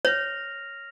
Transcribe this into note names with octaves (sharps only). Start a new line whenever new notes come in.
C#5 F6 A#6 F7